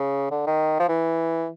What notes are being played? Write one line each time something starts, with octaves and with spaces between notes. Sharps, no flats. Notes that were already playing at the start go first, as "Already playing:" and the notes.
Already playing: C#3
D3
D#3
F3
E3